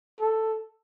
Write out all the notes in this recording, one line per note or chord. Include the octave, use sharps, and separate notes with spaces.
A4